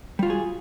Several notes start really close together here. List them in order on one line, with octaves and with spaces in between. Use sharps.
G3 F4 F#4 G#4